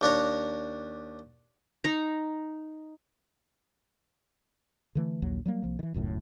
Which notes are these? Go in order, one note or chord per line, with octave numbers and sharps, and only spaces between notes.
D#2 D4 C#5 A#5
D#4 A#5
D3 E3 A3
A#1 D#2 F#3
F#3 G3 A#3
C2 F3 A#3
D#3 E3
E1 C#2 F#2 A2